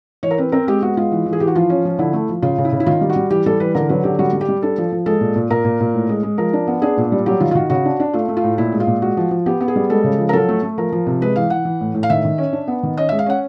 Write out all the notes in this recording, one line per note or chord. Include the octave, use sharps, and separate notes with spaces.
E3 C#5
A#4
C4 B4
C4 A#4
G#3 G4
B3 F#4
G#3 F4
E3
E3
G#4
E3 G4
F#4
F3 F4
C#4
F3
D3 E4
A3
F3
C#3 F4
C#3
E4
C#3
E4
D#3 F4
G3
F#4
G3
E3 G4
G3 A4
E3 B4
D3 A#4
F#3 B4
D3 G4
G3 F#4
G3
G4
G3
D4 A4
F3
F3
G#3 A4
A#2
A#2
A#2 A#4
A#2
A#2
A2
G#3
G#3
F3 A#4
D4
B3
D4 G#4
A#2
G3
F#3 G4
D#3 F4
F4
D#3 F#4
C#3 F#4
D4
D4
A3 F4
A3
F4
A2
A#2 E4
G#3
F4
A#2
G#3 F#4
F3
F3
B3 G4
B3
G#4
G3
G#3 A4
C#3
F3
A#4
F#3 A4
A3
A3
F3 A#4
F3
C3
G#3 B4
E3 F5
E3 F#5
E3
A2
A2
F5
D#3 E5
D#3
C#4
D4
B3
D#3
C#4 D#5
G#3 E5
F5
C#4 F#5